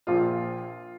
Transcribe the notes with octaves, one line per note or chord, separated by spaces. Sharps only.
A#1 A#2 F3 F4